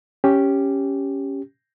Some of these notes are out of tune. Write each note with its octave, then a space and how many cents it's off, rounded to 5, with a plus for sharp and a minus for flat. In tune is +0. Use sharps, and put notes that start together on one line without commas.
C#4 +0 G4 +0